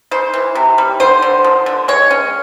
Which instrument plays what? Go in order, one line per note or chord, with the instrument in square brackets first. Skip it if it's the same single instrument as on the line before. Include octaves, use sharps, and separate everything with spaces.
[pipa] C#3 C5
E3
C3
G3
D3 C5
D3
F3
D3
G#3 C#5
C#4